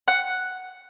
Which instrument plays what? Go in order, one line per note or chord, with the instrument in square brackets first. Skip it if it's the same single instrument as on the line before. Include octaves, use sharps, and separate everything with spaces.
[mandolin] F#5